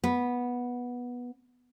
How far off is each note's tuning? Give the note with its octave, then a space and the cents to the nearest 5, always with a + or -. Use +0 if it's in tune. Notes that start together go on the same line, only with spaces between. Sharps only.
B3 -10